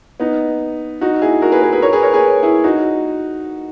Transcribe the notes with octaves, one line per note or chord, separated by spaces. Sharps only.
B3 D#4
D#4 F#4
E4 G#4
F#4 A#4
G#4 B4
G#4 B4
G#4 B4
A#4 C#5
G#4 B4
A#4 C#5
G#4 B4
E4 G#4
D#4 F#4